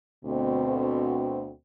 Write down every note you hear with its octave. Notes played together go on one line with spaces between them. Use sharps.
D2 B2 C4